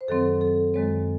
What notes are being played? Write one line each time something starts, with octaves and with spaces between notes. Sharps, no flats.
C5
F#2 D#3 F#3 C4 A4
A4
F#2 D#3 G#3 C4 C#5